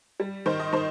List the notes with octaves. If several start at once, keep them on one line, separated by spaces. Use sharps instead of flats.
G3
D#3 C5
D#5
D#3 C5